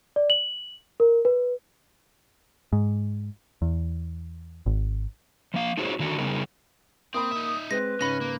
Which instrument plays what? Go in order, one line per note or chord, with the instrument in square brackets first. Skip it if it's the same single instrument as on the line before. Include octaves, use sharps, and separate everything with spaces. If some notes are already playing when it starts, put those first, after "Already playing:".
[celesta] D5
F#7
A#4
B4
[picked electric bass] G#2
E2
G#1
[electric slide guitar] F3 A#3 F5
D#4 F4 F#4 G#4 C5 C#5
D3 D#3 F#4 A4
C#3 G3 B3 D#4 G#4 A#4
[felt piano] A#3 B5 [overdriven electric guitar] C4 [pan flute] D#6
[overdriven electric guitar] D#4 E5
[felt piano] G#3 C4 [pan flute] B4 [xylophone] A#6
[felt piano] G#2 C#3 [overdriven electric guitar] C#4 [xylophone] B5 A#6
[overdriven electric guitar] A#3